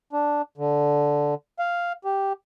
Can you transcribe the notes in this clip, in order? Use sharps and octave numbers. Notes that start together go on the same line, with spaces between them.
D4
D3
F5
G4